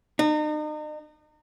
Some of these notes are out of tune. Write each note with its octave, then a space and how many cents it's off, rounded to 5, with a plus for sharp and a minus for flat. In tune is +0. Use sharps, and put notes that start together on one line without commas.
D#4 -40